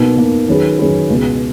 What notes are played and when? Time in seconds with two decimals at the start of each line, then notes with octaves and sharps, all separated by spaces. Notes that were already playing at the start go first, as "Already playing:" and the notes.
Already playing: B2 A#3 D#4
0.17 B2 A#3 D#4
0.48 D#3 F#3 C#4 G#4 B4
0.79 D#3 F#3 C#4 G#4 B4
1.08 C#2 B2 G#3